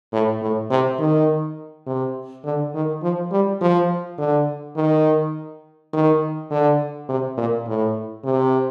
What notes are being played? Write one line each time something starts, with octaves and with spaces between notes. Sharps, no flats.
A2
A2
C3
D#3
C3
D3
D#3
F3
G3
F3
D3
D#3
D#3
D3
C3
A#2
A2
C3